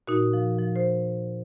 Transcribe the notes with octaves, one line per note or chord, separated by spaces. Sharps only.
A#2 D#4 F#4
F3
F3
C5